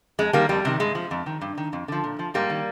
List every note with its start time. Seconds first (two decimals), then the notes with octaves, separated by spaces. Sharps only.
0.19 F2 G#3
0.33 D#3 G3 A#3
0.49 F2 G3
0.65 C3 D#3
0.80 G2 G#3
0.95 F3
1.11 F2
1.26 D#3
1.41 G2
1.58 D#3
1.73 F2
1.88 D3 F3
2.04 A#2
2.19 F3
2.34 G#2 G3 A#3
2.50 D#3